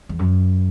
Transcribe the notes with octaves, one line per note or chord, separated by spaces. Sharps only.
E2
F#2